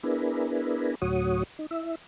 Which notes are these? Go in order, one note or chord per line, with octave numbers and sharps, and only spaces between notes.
B3 D4 E4 G#4 A#4 B4
D2 A2 F#3 F#4 C#5 D#6
D#4
E4 E5